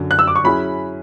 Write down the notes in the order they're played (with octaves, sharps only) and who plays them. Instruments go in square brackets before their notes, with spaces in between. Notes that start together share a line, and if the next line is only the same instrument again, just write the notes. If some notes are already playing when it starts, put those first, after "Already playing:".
Already playing: [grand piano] F#2 D3 F#3
[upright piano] F#6
E6
D6
C#6
[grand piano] F#3 C#4 E4 G#4 [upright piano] B5